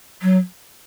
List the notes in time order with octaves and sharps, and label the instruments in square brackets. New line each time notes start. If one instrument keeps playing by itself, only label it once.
[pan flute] F#3